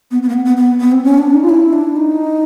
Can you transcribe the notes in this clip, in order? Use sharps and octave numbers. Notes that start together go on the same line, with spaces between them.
B3
B3
A#3
B3
B3
B3
B3
C4
C#4
D4
D#4
F4
E4
D4
D#4